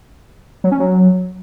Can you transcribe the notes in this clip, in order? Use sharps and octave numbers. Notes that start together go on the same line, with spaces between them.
F#3
C#4
F#3